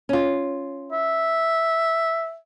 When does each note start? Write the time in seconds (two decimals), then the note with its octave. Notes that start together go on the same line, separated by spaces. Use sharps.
0.09 C#4 F4
0.92 E5